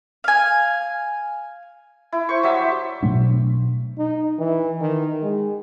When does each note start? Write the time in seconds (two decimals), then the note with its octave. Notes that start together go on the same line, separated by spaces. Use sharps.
0.24 F5 G#5
2.12 E4
2.29 C5 C#6
2.43 F#3 G3 E5
3.03 B2 F#3 A3 D4
3.98 D#4
4.39 E3
4.81 D#3
5.23 G#3